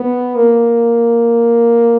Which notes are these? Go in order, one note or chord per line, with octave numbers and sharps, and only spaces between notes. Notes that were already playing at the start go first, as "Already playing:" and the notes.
Already playing: B3
A#3